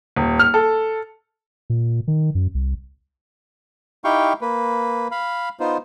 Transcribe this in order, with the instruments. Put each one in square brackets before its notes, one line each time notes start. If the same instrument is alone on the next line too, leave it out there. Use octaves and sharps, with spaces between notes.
[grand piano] D#1
F6
A4
[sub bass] A#2
D#3
F#2
C2
[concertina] D#4 E4 G4 F5 G5 C#6
A#3 B4
F5 B5
B3 D#4 F4 C5